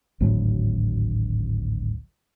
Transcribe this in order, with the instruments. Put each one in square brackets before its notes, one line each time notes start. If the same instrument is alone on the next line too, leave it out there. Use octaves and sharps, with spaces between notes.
[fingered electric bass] G#1 D2 A2 F#3